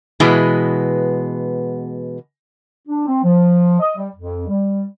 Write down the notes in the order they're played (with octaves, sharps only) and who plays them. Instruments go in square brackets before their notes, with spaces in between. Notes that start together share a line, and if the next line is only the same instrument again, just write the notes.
[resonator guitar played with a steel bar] B2 E3 G#3 B3
[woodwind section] D4
C4
F3
D#5
G3
F2
G3